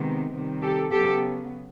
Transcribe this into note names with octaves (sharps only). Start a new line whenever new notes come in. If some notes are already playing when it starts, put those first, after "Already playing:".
Already playing: C3 D#3 G#3 B3
C3 D#3 G3
G4 A4
C#3 F#3 B3 G4 A4